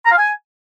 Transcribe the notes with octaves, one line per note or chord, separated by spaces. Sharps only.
A#5
F5
G#5